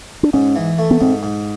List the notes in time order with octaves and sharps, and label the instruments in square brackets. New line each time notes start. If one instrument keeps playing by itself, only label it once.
[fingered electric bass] D4
[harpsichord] G#2 [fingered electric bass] C#4
[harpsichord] E3
A3
[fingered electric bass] B3
[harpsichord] G#2 [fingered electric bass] C4
[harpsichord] G#2